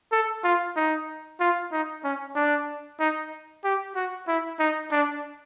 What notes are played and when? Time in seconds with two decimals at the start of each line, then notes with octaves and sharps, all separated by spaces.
0.12 A4
0.44 F4
0.76 D#4
1.40 F4
1.72 D#4
2.04 C#4
2.36 D4
3.00 D#4
3.64 G4
3.96 F#4
4.28 E4
4.60 D#4
4.91 D4